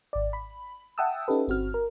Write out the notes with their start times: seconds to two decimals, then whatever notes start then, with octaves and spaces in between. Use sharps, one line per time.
0.13 G#1 D5
0.33 B5
0.98 E5 F#5 G5 A5 D#6 E6
1.28 C#4 D#4 G4 A4 B4
1.48 G1 C4 F#4 F6
1.74 A#4